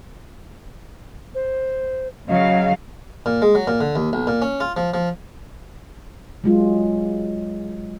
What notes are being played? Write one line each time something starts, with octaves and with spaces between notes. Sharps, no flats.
C5
C#3 F#3 D#5 F5
A#2
G#3
F#3
A#2
D3
D#2
B1
A#2
C#4
F4
F3
F3
F#3 G#3 F4